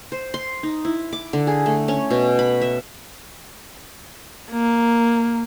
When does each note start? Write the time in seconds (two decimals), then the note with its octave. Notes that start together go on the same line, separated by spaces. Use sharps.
0.12 C5
0.34 C6
0.63 D#4
0.85 E4
1.13 D6
1.33 D3
1.47 G#4
1.66 A3
1.88 C#4
2.11 B2
2.39 B5
2.61 E5
4.52 A#3